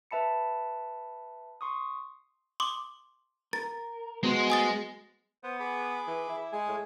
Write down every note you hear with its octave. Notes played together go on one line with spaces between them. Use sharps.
B4 E5 A5 B5 C#7
C6 C#6 D#6
C6 D6 D#6
A#4 A6
G#3 B3 F#4 C5
G#5 D#6 A6
B3 C5
G#4 B5 D6
E3
E4
G#3 G#4 G#5
A2